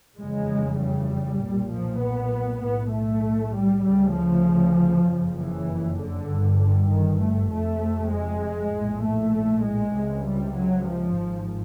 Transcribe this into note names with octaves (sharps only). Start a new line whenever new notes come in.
F1 E2 C#3 G#3
G3
B1 A#2
F3
B3
B1 A2 B3
A3
G3
D2 C#3 G3
F3
F#1 F2 C#3
E3
D3
G1 G2
D3
D#3
A3
F1 F2 C3 A3
G#3
A#1 A2
A3
G#3
C#2 C3
G3
F#3
F3
G#1 G#2